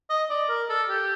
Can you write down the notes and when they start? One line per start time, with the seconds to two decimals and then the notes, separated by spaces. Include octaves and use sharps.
0.10 D#5
0.30 D5
0.49 A#4
0.69 A4
0.89 G4